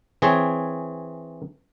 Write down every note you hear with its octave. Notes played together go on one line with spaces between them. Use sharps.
E3 C4 G#4 C#5